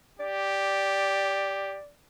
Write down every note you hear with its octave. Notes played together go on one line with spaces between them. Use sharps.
G4 D5